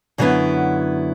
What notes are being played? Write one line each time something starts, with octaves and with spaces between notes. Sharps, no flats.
F#2 D3 F#3 B3 E4